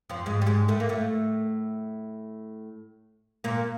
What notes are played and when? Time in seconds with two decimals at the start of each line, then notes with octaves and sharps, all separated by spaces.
0.10 F2 F3
0.26 G#2 G#3
0.42 G3
0.46 G#2 G#3
0.68 A2 A3
0.80 A#3
0.89 A2 A3
3.44 A#2 A#3